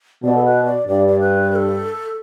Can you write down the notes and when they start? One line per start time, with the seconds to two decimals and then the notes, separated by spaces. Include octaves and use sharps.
0.23 B2 D5
0.37 A4
0.45 B4
0.66 D5
0.88 G2 D5
1.08 D5
1.20 B4
1.51 B4
1.55 A4